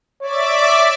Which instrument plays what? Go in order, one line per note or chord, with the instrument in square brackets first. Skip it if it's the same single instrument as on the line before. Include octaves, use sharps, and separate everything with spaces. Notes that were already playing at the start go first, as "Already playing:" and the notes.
[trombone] C#5 [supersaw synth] D5 E5 D6